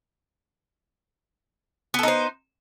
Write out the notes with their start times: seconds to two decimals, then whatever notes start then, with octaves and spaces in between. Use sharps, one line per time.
1.94 B3
1.99 A4
2.03 D#4
2.08 C5